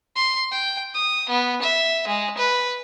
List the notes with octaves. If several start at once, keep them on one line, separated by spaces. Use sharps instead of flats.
C6
G5
D#6
B3
E5
G#3
B4